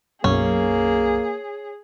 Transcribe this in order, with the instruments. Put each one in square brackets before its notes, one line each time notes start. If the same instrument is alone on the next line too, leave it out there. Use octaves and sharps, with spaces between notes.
[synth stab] B1 F#2 [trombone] A#3 [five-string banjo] C#4 [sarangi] G#4